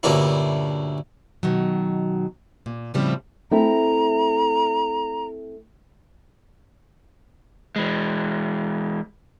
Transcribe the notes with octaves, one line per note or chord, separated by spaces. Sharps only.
D2 G2 A#2 C#4 E4
B2 D#3 F#3
A#2
A2 C#3 F3 G3 C4 E4
A3 C4 E4 A#5
E3 G#3